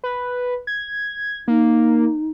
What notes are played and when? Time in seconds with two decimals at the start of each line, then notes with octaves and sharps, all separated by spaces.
0.04 B4
0.67 G#6
1.48 A#3 D#4